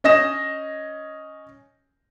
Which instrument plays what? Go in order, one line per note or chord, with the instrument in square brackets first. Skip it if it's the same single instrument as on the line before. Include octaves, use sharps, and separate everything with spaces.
[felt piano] C#4 D#5 D#6 A#6 E7